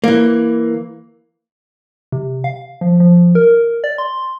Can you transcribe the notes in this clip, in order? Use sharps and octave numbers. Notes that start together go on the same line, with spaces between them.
E3 A#3
C3
F5
F3
F3
A#4
D5
C6